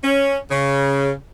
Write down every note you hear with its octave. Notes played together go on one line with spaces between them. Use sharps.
C#4
C#3